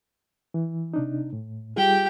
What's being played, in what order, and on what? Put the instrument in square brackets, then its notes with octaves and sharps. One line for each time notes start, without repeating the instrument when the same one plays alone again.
[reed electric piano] E3
C3 D4 D#4
A2
[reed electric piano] G3 F4 G#4 [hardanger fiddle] G4 G5